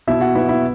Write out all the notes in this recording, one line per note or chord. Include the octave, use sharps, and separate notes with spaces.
B2 E4 E5
F#4 F#5
B3 E4 E5
E4 E5